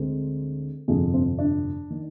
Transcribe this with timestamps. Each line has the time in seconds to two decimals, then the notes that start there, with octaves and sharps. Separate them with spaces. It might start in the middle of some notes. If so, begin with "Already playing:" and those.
Already playing: D2 D3 G#3 C4
0.88 G1 F2 C3 G#4
1.14 C4
1.38 D4
1.90 D#3